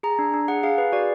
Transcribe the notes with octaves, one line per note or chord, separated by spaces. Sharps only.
G#4 A#5
D4
D4
G#4 F#5
G#4 F5
G#4 B4
F#4 D5